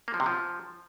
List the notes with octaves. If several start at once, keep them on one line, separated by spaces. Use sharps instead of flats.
A#3
F3
C3
F3